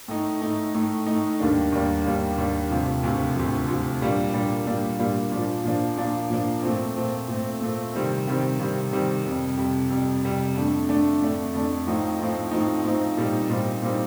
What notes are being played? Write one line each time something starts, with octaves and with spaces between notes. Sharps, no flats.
A2 A3 D#4
A2 A3 D#4
A2 A3 D#4
A2 A3 D#4
D#2 D3 G3 A#3 D4
D#2 D3 G3 A#3 D4
D#2 D3 G3 A#3 D4
D#2 D3 G3 A#3 D4
D2 C3 F3
D2 C3 F3
D2 C3 F3
D2 C3 F3
A#2 G3 A#3 D4
A#2 G3 A#3 D4
A#2 G3 A#3 D4
A#2 G3 A#3 D4
A#2 F3 A#3 D4
A#2 F3 A#3 D4
A#2 F3 A#3 D4
A#2 F3 A#3 D4
A#2 A3 C4
A#2 A3 C4
A#2 A3 C4
A#2 A3 C4
C3 D#3 G3 C4
C3 D#3 G3 C4
C3 D#3 G3 C4
C3 D#3 G3 C4
F2 C3 G3
F2 C3 G3
F2 C3 G3
F2 C3 G3
F2 D3 A3 D4
F2 D3 A3 D4
F2 D3 A3 D4
F2 D3 A3 D4
A2 F3 C4 D#4
A2 F3 C4 D#4
A2 F3 C4 D#4
A2 F3 C4 D#4
A#2 G3 C4 D#4
A#2 G3 C4 D#4
A#2 G3 C4 D#4